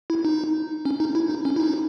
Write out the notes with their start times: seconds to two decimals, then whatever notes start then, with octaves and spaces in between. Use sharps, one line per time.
0.10 E4
0.25 D#4
0.85 C#4
1.00 D#4
1.15 E4
1.30 D#4
1.45 C#4
1.56 E4
1.60 D#4